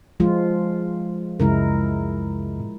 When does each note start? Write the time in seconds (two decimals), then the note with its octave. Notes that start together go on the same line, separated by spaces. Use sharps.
0.20 F3 G#3 F4
1.40 C#2 F#2 C#3 G#3 E4 A#4